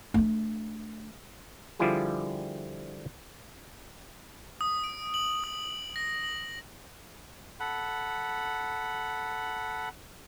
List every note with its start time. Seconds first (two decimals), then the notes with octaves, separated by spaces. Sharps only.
0.14 A3 D4
1.79 D3 F3 G3 E4 F4 G#4
4.61 D#6
4.84 D7
5.14 F#7
5.44 D#6
5.96 A#6
6.24 F#7
7.60 A4 F#5 B5